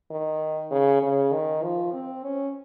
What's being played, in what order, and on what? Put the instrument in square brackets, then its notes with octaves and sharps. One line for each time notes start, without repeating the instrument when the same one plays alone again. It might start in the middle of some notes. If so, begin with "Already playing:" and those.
[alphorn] D#3
C#3
C#3
D#3
F3
C4
C#4